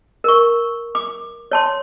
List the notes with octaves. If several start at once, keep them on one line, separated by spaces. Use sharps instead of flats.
A#4 C#6
D6
C#5 A5 C6